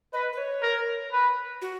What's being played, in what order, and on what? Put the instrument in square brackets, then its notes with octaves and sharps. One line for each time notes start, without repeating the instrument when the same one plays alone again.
[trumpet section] B4 [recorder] D#5
[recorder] B4
C#5
[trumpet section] A#4
B4
[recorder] F#4